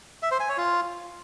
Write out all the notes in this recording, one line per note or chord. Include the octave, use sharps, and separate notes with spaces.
E5
C5
G#5
C#5
F4